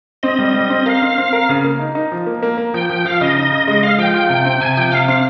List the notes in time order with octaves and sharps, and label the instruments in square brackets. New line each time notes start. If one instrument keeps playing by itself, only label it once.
[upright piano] C4 [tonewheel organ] D#5
[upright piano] G3
G3
C4
[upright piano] A#4 [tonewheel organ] F5
[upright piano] C4
C4
A#4
C#3
A#3
D#4
D#4
F3
A#3
A#3
A#3
[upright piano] F3 [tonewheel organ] G5
[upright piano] F3 [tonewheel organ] G5
[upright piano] F3 [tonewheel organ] F5
[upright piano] C#3 [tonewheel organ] D#5
[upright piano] D#4
C#3
[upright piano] G#3 [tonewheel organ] D#5
[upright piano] G#3 [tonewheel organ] F5
[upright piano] F3 [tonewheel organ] G5
[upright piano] F4
C3
C4
[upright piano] C3 [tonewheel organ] G#5
[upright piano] F3 [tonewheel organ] G5
[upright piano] C3 [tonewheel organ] F5
[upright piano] C4 [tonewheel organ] F5